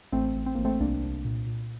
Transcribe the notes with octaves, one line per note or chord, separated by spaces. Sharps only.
A1 A3 C4
A1
C4
A1 A#3
A3 C4
C2 A#3 D4
C2
A#2
A#2